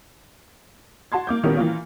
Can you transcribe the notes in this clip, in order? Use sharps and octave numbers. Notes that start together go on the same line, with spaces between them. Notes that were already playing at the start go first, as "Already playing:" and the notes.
F#4 A5 C6 G#6
A#3 D6 G6
A#2 D#3 B3 C#4 G4 A#4
E3 A#3 F4